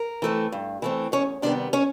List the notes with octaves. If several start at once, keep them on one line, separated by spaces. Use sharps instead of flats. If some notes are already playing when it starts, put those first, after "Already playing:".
Already playing: A#4
E3 A3 C4
G2
E3 A3 C4
E2 C#4 C#5
C3 D#3 G3 B3 D4 D5
C#4 C#5